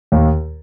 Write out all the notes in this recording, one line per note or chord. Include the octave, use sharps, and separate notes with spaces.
D#2